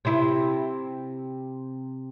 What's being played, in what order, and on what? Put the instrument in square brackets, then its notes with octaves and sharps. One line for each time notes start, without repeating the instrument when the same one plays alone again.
[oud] C3 E4